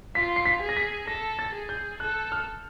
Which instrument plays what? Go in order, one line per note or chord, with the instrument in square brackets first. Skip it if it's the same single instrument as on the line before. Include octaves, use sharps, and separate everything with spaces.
[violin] F4 [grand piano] B6
[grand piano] C7
B6
[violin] G#4
[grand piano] A#6
B6
[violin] A4 [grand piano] A#6
[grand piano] A6
[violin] G#4
[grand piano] G6
[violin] A4 [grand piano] F#6
[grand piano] F6